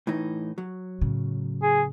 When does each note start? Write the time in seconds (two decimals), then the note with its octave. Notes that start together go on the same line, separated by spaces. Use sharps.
0.07 A2 E3 D#4
0.58 F#3
1.01 A2 C#3
1.63 G#4